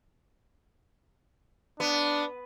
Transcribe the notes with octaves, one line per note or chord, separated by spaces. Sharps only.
B3 D4